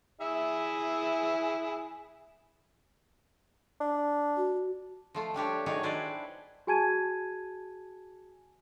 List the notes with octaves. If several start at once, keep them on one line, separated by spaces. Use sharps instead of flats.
E4 G#4 E5
D4
F#4
F3 A3 F4
G3 D4 G4 C#5
D#3 F#3 D4 D#4 G#4 C#5
D4 E4 B4 C5 D5
F#4 G#4 G#5 A5 G#6 D#7